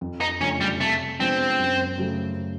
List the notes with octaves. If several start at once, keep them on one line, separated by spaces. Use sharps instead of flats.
F2
D#4
C#3 F3 A3 C#4 D4
G3
C3 A3
F3 G#3 B3 C4 D4
F#2
C#3 F#3 A3